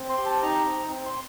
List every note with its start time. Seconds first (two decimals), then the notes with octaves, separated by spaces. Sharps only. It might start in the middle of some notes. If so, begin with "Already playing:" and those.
Already playing: C4
0.10 C6
0.18 G4
0.26 A5
0.42 D#4 A#5
0.65 C4
0.89 C4
1.06 C6